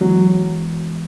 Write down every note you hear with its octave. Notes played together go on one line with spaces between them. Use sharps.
E3 F#3 G#3 B3